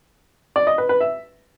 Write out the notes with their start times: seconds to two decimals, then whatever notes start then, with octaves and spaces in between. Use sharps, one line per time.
0.56 D5
0.67 D#5
0.78 B4
0.89 B4
1.00 E5